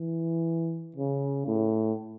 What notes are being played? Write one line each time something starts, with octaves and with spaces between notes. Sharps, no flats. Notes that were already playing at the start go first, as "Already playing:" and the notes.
Already playing: E3
C#3
A2